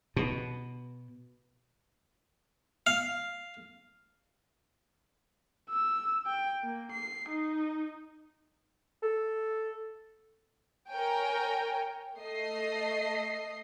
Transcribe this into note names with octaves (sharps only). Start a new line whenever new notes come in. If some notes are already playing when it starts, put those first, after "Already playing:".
B2
F5
E6
G5
A#3
C7
D#4
A4
A#4 C#5 G5 G#5
A3 D#5 C7